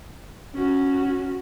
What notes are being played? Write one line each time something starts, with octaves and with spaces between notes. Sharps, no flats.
C#4 F#4